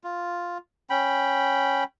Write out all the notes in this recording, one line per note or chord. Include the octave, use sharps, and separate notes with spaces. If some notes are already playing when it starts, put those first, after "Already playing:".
F4
C#4 G5 B5